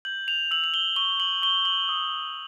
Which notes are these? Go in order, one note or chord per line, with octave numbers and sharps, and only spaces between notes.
G6 F#7
F7
E6 F#7
F#7
G7
C#6 G7
F#7
C#6 G7
F#7
D#6